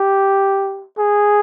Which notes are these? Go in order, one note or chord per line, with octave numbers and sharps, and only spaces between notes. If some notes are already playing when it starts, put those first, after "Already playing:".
Already playing: G4
G#4